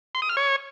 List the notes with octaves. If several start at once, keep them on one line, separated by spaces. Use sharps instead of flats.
C6
D#6
F6
C#5